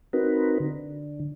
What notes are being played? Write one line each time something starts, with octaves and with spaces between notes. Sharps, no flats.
C4 D#4 F#4 A#4 B4
D3